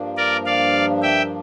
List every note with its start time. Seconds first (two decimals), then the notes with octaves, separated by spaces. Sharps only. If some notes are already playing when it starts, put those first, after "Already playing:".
Already playing: G2 F3 A#3 D4
0.17 A#4 D5
0.46 D5 F5
1.02 E5 G5